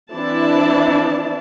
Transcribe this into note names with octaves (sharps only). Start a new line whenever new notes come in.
E3 C4 D4 E4 D5 A5